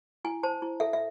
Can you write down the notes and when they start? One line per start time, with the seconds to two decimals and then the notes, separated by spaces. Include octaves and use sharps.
0.25 E4 G#5
0.43 C5 A5
0.62 E4
0.80 A4 E5
0.93 E5